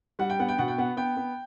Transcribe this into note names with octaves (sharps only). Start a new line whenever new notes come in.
G3 F#5
G5
B3 F#5
G5
B2 F#5
G5
B3 F#5
B3 G5
B3